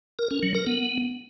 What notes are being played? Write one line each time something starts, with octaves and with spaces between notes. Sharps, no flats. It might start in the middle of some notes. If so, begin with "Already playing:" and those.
A#4
C#4
F#3
A#4
B3